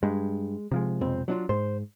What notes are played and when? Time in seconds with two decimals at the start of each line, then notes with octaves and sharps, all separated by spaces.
0.03 G2 G#3
0.72 C3 F3 G#3
1.01 B1 F2 C4
1.28 F#3 D4 F4
1.49 G#2 C5